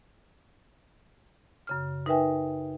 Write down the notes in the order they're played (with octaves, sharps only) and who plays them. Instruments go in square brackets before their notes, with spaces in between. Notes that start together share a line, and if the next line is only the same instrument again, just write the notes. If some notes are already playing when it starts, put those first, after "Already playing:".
[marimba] F#2 C#3 F6
D#4 A#4 B4 E5 G5 G#5